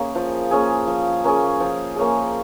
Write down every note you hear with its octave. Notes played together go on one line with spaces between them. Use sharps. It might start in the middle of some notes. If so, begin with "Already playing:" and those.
Already playing: A#3 C#4 G#4
F3
A#3 C#4 G#4
F3
A#3 C#4 G#4
F3
A#3 C#4 G#4